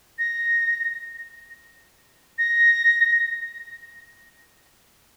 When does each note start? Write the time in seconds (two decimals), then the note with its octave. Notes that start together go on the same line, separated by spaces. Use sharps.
0.19 A#6
2.38 A#6